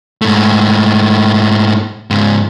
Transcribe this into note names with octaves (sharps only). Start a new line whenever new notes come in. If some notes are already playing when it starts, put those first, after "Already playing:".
G#2 A3
G#2 C#3